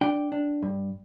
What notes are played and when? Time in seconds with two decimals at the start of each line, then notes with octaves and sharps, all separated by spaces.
0.01 D4 G5
0.32 D4
0.63 G2